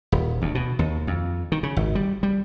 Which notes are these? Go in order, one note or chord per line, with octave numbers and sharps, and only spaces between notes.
D#1
D2
B2
D#2
F2
D#3
C#3
G#1
G3
G3